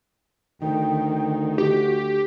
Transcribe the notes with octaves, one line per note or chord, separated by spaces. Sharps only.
D2 D#3 G5
F#4 G4